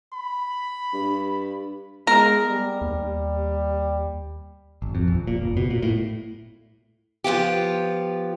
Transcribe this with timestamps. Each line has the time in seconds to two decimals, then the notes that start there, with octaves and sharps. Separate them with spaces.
0.13 B5
0.93 G2
2.07 G#3 B3 A#4
2.48 G3
2.81 D#2
4.82 G#1
4.95 F2
5.08 D#1
5.27 A#2
5.42 F#1
5.57 B2
5.70 A#2
5.82 A2
7.24 F3 B3 F4 G4